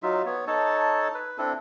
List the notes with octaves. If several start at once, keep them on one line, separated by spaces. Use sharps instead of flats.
F#3 D#4 F4 E5
B3 C#5
D#4 A4 C#5 A5
B4
C4 D4 E4 A4